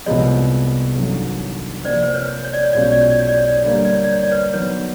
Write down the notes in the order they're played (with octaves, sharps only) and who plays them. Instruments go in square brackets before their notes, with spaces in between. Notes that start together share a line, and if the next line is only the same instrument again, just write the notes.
[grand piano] C2 C3 F3 G#3 B3 [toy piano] C#5 D#5
[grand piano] A1 G2 D#3 F#3 A3
[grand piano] C3 F3 A#3 [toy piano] C5 D5
[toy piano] C5
B4 C#5
C#5
D5
C#5
[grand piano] B1 B2 G#3 C#4 F4 [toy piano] D5
[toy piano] C#5
D5
C#5
D5
C#5
D5
C#5
D5
C#5
[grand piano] D3 G3 A#3 [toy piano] D5
[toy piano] C#5
D5
C#5
D5
C#5
D5
B4 C#5
[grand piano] D#3 F#3 B3 [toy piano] B4 C#5